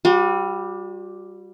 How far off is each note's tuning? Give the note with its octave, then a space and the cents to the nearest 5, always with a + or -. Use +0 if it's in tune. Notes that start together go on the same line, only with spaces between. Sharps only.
G3 +0 F#4 -45